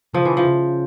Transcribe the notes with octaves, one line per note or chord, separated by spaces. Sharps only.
C#3 F3
E3
F3
C#3